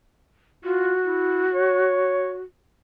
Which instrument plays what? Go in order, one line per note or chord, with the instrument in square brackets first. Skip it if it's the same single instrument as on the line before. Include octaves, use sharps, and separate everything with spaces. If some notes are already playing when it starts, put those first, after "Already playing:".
[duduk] F4 [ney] F#4
[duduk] E4
C#5